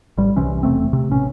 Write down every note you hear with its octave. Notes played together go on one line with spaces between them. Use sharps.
A1 G3
C2 C3 E3 C#4
E1 A3 C4
C3
A1 C#4